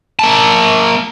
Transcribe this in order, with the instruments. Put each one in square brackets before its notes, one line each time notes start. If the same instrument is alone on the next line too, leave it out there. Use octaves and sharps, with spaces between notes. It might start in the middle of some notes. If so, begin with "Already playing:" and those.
[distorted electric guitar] A#3 A5